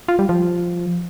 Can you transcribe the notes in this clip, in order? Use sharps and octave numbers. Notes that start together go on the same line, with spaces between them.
F4
G3
F3